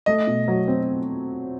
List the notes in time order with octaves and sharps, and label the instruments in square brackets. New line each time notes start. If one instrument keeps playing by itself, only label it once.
[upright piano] A3 [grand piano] D#5
[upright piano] B2
F#3
C4